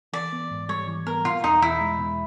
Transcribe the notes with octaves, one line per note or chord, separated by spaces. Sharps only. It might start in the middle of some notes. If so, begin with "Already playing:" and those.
E3 D5
B3
G#2
G3 C#5
E3
B3 A#4
B2 F4
E2 D#4
E2 E4
G#3
B2